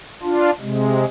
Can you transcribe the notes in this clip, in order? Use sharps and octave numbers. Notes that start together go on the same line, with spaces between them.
D4 F4
C3 G#3